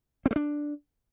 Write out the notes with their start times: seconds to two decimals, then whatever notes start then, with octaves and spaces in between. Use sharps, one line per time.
0.26 C4
0.31 A3
0.36 D4